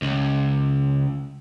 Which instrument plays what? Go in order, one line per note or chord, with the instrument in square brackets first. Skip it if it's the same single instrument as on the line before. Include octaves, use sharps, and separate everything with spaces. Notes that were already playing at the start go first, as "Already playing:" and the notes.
[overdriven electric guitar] C#2